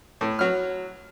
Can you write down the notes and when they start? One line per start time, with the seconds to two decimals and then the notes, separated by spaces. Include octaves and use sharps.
0.21 A2
0.39 F#3 F6